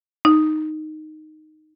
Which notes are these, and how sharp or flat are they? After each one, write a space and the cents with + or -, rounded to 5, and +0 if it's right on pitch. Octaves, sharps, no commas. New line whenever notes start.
D#4 -5